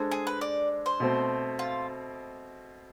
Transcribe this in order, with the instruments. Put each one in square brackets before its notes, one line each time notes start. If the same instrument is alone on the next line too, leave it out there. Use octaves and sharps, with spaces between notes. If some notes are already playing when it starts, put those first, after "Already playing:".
Already playing: [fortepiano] G#3 D4 A4 C5
[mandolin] G#4
B4
D5
C5
[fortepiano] B2 A3 C4
[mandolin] F4